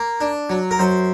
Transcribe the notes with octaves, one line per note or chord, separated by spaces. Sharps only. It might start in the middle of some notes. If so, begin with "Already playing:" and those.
Already playing: A#3
D4
F#3
A#4
F#2 C5